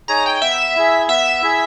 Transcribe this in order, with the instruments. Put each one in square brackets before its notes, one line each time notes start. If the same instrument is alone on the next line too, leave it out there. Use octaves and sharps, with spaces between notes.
[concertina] D#4 G#4 C#5 G#5 [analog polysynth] A#5
[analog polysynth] G5
[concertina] B3 [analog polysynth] E5
[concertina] E4 G#4
[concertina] B3 [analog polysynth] E5
[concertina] E4 G#4